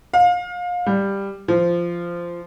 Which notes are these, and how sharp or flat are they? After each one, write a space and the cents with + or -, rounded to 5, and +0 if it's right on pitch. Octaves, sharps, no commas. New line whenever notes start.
F5 +30
G3 +10
F3 -15